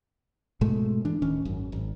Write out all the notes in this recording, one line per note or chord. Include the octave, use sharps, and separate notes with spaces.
G#2 B2 G#3 A3
E3 D4
D1 D#3 C#4
G#1 F#2
G#1